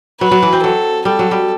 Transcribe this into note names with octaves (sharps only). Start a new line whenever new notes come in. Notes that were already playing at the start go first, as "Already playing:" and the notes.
F#3 B4
F#3
E3
C4
F#3 A4
G3 A4
F#3
G3